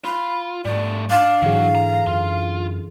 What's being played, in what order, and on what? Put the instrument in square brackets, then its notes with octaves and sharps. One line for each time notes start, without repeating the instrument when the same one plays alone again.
[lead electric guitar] F4 [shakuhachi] B5
[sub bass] G#2 [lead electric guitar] G3 A3 [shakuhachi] D5
[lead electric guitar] D4 [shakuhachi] F5
[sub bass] G#2 [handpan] D3 E3 G#4 [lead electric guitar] F#3
[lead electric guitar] A#5
[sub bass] F#2 [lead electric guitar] F4